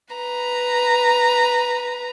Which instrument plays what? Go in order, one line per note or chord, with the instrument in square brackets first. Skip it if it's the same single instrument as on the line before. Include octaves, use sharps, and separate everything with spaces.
[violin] B4 A#5